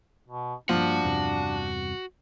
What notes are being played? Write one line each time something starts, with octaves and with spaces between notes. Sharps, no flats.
B2
G2 F3 A#3 D4 F#4
E2 G2 C3